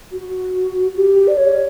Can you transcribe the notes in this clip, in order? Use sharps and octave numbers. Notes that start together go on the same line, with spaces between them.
F#4
G4
D5
C#5